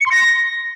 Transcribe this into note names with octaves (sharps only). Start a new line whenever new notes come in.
C#7
C6
A#6